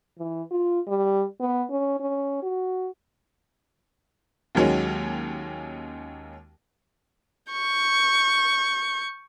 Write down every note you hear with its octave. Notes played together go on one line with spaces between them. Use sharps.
E3
F4
G3
B3
C#4
C#4
F#4
D#2 D#3 F#3 G#3 C#4
C#6 G6